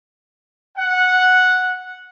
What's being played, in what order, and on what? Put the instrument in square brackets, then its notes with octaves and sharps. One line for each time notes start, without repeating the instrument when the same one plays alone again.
[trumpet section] F#5